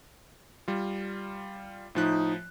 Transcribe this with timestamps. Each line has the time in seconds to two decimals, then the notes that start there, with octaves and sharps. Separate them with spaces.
0.68 G3 F4
1.95 A2 F3 D#4 F#6